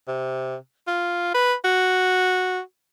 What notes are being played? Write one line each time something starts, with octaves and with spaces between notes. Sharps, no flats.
C3
F4
B4
F#4